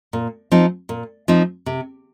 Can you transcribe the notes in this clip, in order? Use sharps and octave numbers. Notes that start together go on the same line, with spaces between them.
A#2
F3 C4 D#4
A#2
F3 C4 D#4
C3